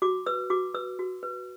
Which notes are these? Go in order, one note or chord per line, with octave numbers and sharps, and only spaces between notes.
F#4 D6
B4 E6
F#4 D6
B4 E6
F#4
B4